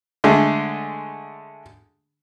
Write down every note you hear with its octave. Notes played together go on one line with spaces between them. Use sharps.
D3 G#3 A3